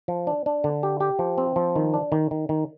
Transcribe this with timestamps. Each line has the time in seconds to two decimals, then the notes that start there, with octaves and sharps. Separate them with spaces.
0.08 F3
0.27 D4
0.46 D4
0.64 D3
0.83 G4
1.00 G4
1.19 F3
1.38 C4
1.56 F3
1.76 D#3
1.94 D4
2.12 D#3
2.31 D#3
2.49 D#3